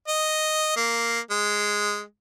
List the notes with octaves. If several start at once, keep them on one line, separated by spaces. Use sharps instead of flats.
D#5
A#3
G#3